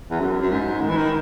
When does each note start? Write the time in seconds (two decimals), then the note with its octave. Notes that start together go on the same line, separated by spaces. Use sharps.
0.10 E2
0.20 F#2
0.41 F#2
0.51 G#2
0.81 D#3
0.89 E3
0.97 D#3